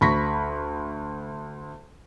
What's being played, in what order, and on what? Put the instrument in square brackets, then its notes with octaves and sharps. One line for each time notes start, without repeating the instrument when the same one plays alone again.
[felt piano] D2 B5 C#6 A#6 B6